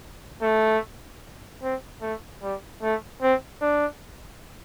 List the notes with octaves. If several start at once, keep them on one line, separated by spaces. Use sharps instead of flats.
A3
C4
A3
G3
A3
C4
D4